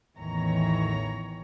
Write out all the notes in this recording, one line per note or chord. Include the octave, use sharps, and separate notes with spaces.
A1 E2 D#3 E3 C#5 A#5